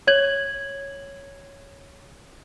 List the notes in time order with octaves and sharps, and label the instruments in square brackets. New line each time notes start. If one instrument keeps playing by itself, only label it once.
[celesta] C#5 G#6 F#7